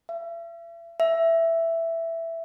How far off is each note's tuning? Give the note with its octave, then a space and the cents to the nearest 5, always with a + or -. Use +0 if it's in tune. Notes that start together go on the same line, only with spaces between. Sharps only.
E5 +40
E5 +5